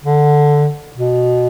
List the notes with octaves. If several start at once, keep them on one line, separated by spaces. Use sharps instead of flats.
D3
B2